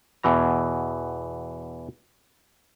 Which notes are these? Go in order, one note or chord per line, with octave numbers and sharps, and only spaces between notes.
E2 B2 E3 A#5